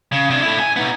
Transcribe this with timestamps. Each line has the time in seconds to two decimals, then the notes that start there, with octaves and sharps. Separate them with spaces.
0.13 C#3
0.31 C3 D4
0.42 A3 E4
0.60 G#5
0.76 B3 D#4